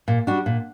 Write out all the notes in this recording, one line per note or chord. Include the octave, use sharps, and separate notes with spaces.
A#2
G3 D4 F#4
A#2